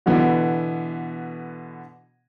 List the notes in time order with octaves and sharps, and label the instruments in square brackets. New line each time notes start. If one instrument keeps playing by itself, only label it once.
[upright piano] B2 D3 E3 B3